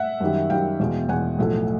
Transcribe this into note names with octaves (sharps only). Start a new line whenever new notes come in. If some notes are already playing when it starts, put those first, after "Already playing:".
Already playing: E5 F#5
F#2 D#3 G3
F#2 D#3 G3 F5 G5
E2 B2 G#3
E2 B2 G#3 F#5 G#5
B1 A2 F3 A3